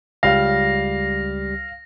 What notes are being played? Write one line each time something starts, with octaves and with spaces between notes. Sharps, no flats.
C#2 G3 F5 A#6